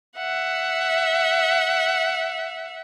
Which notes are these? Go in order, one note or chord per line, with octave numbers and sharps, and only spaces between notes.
E5 F#5